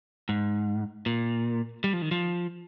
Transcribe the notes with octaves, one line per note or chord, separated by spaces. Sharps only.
G#2
A#2
G3
F3
D#3
F3